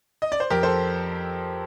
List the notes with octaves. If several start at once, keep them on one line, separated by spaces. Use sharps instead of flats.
D#5
D5
C5
F2 G4 A#4
A4 C5